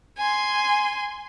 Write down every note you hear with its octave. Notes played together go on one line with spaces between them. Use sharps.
G#5 C6